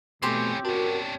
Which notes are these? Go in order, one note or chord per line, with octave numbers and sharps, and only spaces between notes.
B2 E3 A3 C4 C#4 G4 C6
C#4 D4 F#4 A#4